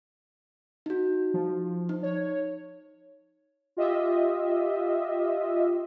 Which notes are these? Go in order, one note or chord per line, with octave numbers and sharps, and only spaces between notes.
D#4 F#4
F3
D#4
C#5
F4 G4 D#5 E5